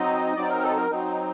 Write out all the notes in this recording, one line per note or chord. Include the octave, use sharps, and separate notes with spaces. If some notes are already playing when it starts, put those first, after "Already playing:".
Already playing: F#3 C4 D#4 D#5
F#3 C4 D#4 D5
A#4
A4
A#4
F#3 C4 D#4